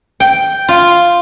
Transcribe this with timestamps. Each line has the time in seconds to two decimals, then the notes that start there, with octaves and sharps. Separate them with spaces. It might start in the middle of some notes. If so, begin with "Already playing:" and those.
0.20 G5
0.68 F4